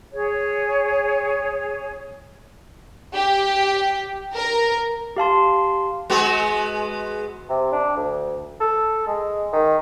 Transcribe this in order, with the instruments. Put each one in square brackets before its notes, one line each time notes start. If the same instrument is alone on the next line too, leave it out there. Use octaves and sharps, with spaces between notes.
[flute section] G#4 C#5
[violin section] G4
A#4
[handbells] G4 F5 A5 C6
[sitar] G#3 B3 F#4
[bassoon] C3
D4
D2
A4
G#3
D#3